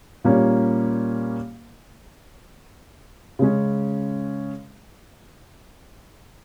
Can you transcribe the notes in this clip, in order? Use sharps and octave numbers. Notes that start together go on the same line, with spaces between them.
A#2 G3 A#3 C#4
C#3 G#3 C#4